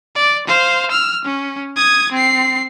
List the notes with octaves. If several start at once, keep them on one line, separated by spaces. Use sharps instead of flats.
D5
C5 F5
E6 F6
C#4
D#6 G#6
C4 C7